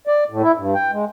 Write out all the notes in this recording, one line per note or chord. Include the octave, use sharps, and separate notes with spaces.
D5
A2
E4
G2
G5
G#3